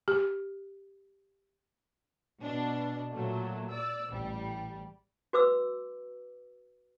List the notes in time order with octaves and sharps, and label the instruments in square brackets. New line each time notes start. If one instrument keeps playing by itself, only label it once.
[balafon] G4
[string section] B2 D4
A#2 F#3 A3
D5 E6
A1 G3
[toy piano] F#4 B4 D6 E6